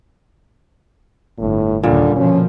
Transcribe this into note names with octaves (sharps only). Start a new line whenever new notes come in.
G1 A2
D#2 A#2 D3 G3
B2 D3 F3 C#4